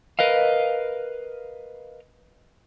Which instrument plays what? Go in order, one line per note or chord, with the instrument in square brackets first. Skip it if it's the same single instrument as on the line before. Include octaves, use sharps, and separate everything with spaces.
[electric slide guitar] A#4 B4 D#5 F5